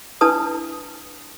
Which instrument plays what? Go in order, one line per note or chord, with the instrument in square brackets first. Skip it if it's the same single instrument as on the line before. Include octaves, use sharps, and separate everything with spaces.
[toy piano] D4 E4 B4 A5 D#6